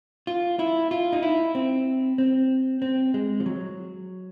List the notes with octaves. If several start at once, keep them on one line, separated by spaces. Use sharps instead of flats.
F4
E4
F4
D#4
E4
C4
C4
C4
G#3
F3
F#3